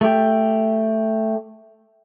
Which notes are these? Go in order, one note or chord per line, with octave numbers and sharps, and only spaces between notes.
A3 G4